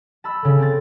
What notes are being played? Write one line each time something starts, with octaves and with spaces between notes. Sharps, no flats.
A5 B5 E6
C#3 A3
C4 A6